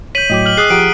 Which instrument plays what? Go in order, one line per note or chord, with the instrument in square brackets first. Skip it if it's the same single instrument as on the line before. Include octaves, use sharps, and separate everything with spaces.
[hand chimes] C#5 G6 [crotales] B6 D#7 F#7
[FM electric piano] A2 F#3 [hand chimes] D#5 G5 D6
[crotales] F6 F#7
[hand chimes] G#4 [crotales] D#6 F#6 C7
[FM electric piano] F3 G4 [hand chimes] F#5 A#5 D#6 [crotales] D7